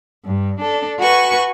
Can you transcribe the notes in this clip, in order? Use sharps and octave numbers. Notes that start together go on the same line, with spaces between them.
G2
D4 A4
F#4 B4 G#5 C#6